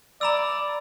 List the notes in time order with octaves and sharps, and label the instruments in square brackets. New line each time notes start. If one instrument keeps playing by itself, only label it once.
[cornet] D5 [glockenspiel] A#5 B5 E6